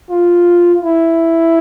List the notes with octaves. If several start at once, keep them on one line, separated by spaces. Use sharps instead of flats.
F4
E4